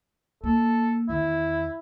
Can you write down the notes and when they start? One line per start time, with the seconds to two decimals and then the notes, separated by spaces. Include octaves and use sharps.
0.44 A#3 A4
1.09 E2 D#3 E4